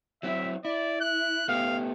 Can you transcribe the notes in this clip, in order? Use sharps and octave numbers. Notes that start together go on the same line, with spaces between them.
F#3 C4 E4 E5
E4 D5
F#6
A3 B3 G4 F5